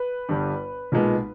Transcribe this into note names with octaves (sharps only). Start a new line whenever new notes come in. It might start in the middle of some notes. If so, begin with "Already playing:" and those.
Already playing: B4
G1 G2 G3
B1 A#2 G#3 B3